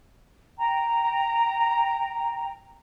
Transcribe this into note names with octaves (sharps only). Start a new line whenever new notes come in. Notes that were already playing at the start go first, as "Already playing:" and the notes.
G5 A#5